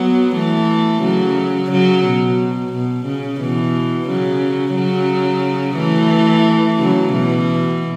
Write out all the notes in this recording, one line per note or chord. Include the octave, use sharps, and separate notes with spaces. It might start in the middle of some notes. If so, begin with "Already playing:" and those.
Already playing: F#3 B3
E3 A3
C#3 F#3
C#3 F#3
B2
B2
C#3
B2 E3
C#3 F#3
C#3 F#3
E3 A3
C#3 F#3
B2 E3